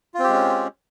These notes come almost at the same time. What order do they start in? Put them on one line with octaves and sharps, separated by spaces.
F4 C4 G4 G#3 C#4